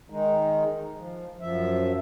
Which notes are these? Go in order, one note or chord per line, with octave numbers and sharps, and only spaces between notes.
D#3 G#3 D#4
F3
F#2 F3 E5